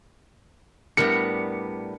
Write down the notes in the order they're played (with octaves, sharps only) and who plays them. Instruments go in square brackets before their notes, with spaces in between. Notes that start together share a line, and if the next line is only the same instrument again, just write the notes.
[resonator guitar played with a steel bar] A2 G3 B3 [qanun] D4 A#4 [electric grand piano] C#7